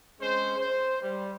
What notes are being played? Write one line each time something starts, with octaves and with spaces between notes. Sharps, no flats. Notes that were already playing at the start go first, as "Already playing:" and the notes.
G#3 C4 C#4 C5
C5
G3